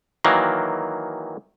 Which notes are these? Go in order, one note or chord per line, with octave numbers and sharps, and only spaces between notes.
D#3 E3 F#3 A#3